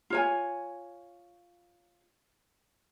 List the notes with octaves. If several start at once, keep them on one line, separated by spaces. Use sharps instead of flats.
F4 C#5 G#5